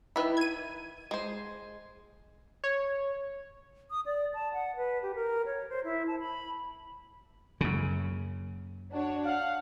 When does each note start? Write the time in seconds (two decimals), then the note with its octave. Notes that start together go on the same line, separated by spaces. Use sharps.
0.16 D#3 E4 B4 E5 B5
0.37 G#6 D#7
1.11 G#3 C5
2.64 C#5
3.91 D#6
4.06 D5
4.34 A5
4.53 F#5
4.76 B4
5.03 G4
5.15 A#4
5.46 C#5
5.69 C5
5.84 E4
6.07 A5
6.20 B5
7.61 F#2 C#3 F#3 A#3
8.92 D4 F#4 C#5
9.25 F5 F#5